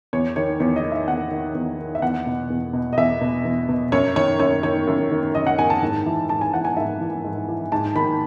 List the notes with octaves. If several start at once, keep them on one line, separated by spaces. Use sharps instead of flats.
E2 C#5
D#3 C#5
E2 C#5
D#5
D#3
E5
E2 F#5
D#3
E2
D#3
E5
E2 F#5
B2
E2
B2
D#5
E2 E5
B2
E2
B2
F#2 C#5
D#3 C#5
F#2 C#5
D#3 C#5
F#2
D#3
F#2 D#5
F#5
D#3 G#5
A5
G#2
E3
G#2 A5
G#5
E3 F#5
G#5
G#2 E5
E3
G#2
E3
G#2 A5
D#3 B5